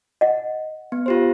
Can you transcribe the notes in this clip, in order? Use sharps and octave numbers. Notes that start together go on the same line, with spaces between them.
D#5 F#5
B3
F4 G4 C5